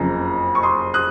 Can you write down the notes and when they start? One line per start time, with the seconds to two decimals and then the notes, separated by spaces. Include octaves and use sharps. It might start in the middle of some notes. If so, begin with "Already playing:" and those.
Already playing: F#1 F2 C#3 A#5
0.55 C#6
0.63 C6 D#6
0.94 D#6 F#6